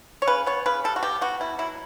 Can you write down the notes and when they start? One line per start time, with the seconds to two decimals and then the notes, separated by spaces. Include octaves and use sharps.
0.22 C#5
0.27 C#3 B4
0.46 B3 C#5
0.66 C#3 B4
0.84 G3 A4
0.96 F#4
1.03 B2 G4
1.21 B3 F#4
1.40 B2 E4
1.58 F#3 E4